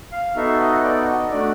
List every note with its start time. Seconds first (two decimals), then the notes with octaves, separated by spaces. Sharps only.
0.12 F5
0.36 B3 D#4 F#4 A4 E5
0.60 D#5
0.83 D5
1.07 D#5
1.31 A3 D4 F#4 D5